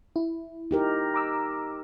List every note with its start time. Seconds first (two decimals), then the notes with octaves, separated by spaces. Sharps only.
0.16 E4
0.71 D#4 G4 A#4
1.14 A#5 D6 E6